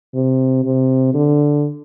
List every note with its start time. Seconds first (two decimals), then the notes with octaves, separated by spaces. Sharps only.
0.14 C3
0.64 C3
1.14 D3